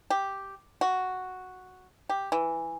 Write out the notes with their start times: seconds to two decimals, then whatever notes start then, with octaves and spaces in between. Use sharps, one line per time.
0.10 G4
0.81 F#4
2.09 G4
2.32 E3